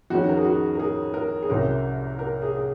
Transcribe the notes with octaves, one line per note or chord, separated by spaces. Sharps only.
F2 D#3 G#3 C#4 F#4
A#4
G#4
F#4
A#4
G#4
A#4
G#4
C2 C3 F#3 C#4 A#4
A#4
G#4
G#4